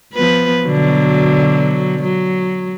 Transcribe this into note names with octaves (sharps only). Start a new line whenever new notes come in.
F3 B3 B4
B2 D3 F#3
F#3